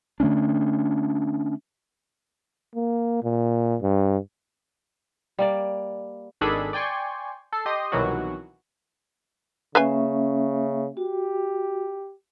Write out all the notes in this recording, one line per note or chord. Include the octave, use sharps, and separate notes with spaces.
D3 A3 C#4 D4
A#3
A#2
G2
G3 A#3 D5
G#1 D#3 D4 G#4 A4 B5
D5 G5 G#5 C6 C#6
A4 C7
G4 D#5 C6 D#6
C2 B2 D#3 E3 F#3 F#4
C#3 A#3 C#4 B4 E5 F5 G#5
F#4 G4